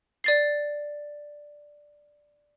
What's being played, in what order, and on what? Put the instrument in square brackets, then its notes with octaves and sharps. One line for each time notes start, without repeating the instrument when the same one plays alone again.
[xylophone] D5 A6 C7